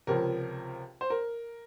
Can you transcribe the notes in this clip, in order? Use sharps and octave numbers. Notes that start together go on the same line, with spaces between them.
C#2 C3 F3 A#4
C5
A#4